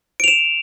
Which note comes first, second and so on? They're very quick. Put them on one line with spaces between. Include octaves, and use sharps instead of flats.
D7 F7 E7